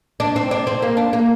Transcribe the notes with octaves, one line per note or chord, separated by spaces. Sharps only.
D4
C4
D4
C4
A#3
D4
A#3